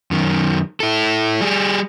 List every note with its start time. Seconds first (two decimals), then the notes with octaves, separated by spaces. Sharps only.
0.11 F#2 D#3
0.80 E4 A4
1.41 G3 G#4